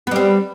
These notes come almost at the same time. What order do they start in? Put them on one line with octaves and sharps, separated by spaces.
B3 G3 C4